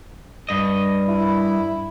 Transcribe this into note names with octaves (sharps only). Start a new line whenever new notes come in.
G2 D#5
E4